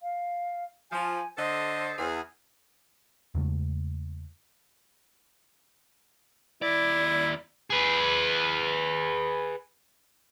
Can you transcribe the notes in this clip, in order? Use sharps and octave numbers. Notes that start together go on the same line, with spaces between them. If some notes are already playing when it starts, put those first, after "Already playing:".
F5
F3 G#5
D3 A4 C5 D#5
E2 G#4
E2 C#3 G#3 A3
D#2 E4 D5
G#4 B4